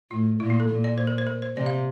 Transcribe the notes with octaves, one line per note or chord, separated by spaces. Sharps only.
A2 F4
A#2 E4
F4
A4
A#2
D5
C5
A#4
C5
A#4
C5
C3 D5
F5